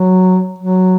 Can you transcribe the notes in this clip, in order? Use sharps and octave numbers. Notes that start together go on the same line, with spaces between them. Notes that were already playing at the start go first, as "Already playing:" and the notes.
Already playing: F#3
F#3